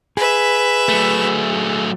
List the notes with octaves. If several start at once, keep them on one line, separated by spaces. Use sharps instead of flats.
G#4 B4 E5
F#3 A3